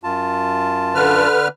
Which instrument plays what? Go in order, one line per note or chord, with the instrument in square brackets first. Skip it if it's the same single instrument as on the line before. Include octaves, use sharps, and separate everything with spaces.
[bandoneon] F#2 F4 A5
[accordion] D3 B4 F6